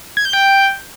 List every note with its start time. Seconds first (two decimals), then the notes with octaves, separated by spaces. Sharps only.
0.17 G#6
0.25 G6
0.33 G5